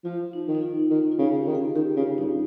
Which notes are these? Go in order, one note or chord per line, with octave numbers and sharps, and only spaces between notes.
F3 F4
D#4
D#3
D#4
F4
D#4
D#3 F4
F4
C#3
G4
D#3
G#4
D#3 G4
C#3 F4
G2 D#4